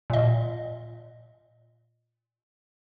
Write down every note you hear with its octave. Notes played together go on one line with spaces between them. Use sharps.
A#2 D#5